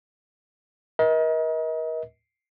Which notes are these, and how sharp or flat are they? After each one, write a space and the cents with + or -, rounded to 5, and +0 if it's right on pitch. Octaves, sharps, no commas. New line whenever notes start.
A#4 +40 D#5 +35